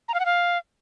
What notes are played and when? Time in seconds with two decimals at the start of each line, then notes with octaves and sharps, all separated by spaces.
0.08 A#5
0.14 F5
0.20 F#5
0.26 F5